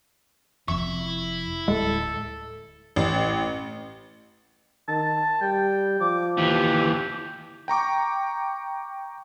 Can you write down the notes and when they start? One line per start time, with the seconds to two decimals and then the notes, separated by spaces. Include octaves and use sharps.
0.68 F1 F3 C4 E4 E5 C#6
1.68 D1 G#3 A4
2.96 A1
4.88 D#3 A5
5.41 G3 G5
6.01 F3 D6
6.37 D#2 E3 G4
7.68 G5 A#5 C#6 D6